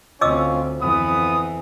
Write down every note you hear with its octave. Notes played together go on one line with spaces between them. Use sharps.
D2 C4 C#4 F4 D#5 D6 E6
F2 E3 B3 D#6